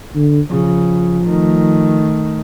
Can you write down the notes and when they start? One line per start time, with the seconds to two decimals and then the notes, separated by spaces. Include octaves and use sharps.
0.15 D3
0.51 C#3 F3
1.25 D#3 A3